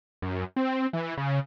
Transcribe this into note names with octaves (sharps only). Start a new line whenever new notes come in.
F#2
C4
E3
C#3